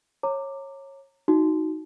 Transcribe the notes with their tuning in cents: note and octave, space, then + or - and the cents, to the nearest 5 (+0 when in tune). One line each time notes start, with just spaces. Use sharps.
C#5 -20 A#5 -25 D6 +5
D#4 +10 F#4 +0